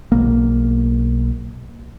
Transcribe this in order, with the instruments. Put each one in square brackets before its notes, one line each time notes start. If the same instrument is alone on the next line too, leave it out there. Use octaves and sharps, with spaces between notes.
[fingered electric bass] B1 A#3